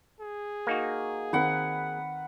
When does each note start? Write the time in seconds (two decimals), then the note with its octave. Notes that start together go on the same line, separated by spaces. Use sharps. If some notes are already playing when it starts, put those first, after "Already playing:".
0.21 G#4
0.67 A#3 D#4 F#4
1.33 D#3 C4 A#4 B4 F#5